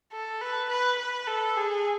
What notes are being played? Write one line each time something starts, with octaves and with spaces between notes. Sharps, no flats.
A4
B4
B4
B4
A4
G#4